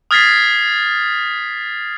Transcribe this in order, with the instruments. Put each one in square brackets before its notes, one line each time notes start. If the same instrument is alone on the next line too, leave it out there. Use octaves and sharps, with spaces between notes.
[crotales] D#6 F6 G#6 A6 B6 C7